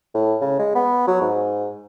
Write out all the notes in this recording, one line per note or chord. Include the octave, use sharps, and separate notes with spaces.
A2
C#3
G#3
B3
F#3
G#2